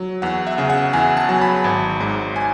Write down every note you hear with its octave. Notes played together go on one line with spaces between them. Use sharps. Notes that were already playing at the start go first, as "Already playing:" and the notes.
Already playing: F#3
E2 F#5
E5
C#3
F#5
E2 G#5
A5
F#3
B5
G#1
G#2
G#5